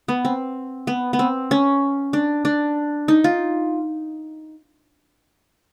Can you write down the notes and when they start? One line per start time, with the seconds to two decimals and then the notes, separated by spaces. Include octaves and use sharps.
0.08 B3
0.25 C4
0.87 B3
1.13 B3
1.19 C4
1.51 C#4
2.13 D4
2.45 D4
3.08 D#4
3.24 F4